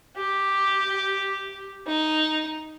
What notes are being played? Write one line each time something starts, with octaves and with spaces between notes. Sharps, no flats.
G4
D#4